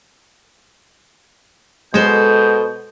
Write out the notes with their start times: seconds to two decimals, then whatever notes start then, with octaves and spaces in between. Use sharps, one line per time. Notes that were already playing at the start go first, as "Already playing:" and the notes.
1.94 B2 G#3 A4 C5 G6